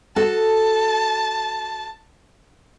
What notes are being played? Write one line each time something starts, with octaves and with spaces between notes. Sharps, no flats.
F#4 A4 A5